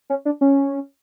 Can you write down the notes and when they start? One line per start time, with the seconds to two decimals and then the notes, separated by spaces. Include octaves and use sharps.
0.10 C#4
0.25 D4
0.41 C#4